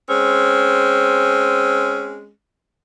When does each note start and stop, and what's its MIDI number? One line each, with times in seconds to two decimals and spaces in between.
0.09 2.29 56
0.09 2.29 60
0.09 2.29 61